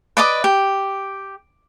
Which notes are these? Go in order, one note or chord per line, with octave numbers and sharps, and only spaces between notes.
B4 D5 D#5 D6
G4